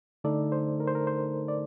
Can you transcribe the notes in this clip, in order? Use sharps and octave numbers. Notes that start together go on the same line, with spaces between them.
D3 A3 D#4 A4 D5
C5
A#4
C5
A#4
C5
D5